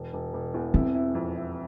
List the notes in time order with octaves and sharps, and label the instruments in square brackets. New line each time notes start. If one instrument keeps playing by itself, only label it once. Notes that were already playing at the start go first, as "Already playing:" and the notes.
Already playing: [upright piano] E1
E1
E1
E2
[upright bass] C4 [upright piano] E4
[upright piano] E4
F2
E4